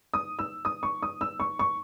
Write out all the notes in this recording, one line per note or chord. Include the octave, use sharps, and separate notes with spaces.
D#6
E6
D#6
C#6
D#6
E6
C#6
C#6